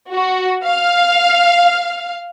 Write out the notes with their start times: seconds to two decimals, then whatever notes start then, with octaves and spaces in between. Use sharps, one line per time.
0.12 F#4
0.64 F5